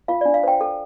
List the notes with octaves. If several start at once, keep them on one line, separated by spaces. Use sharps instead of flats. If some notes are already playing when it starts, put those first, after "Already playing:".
F4 F5
D5
D4
F5
C5 G5
A4